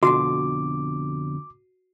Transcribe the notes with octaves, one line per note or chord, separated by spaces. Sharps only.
F2 B2 D3 F#4 D6